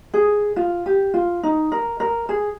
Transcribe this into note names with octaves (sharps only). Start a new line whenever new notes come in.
G#4
F4
G4
F4
D#4
A#4
A#4
G#4